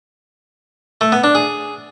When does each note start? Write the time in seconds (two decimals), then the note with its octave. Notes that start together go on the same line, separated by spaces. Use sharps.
1.01 A3
1.12 B3
1.24 D4
1.35 G#4